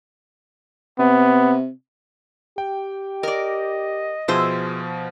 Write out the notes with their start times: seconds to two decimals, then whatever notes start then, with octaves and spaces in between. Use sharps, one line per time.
0.99 C3 B3
2.58 G4 G5
3.23 A#4 D5 D#5
4.28 B2 F3 G#4 C5 E5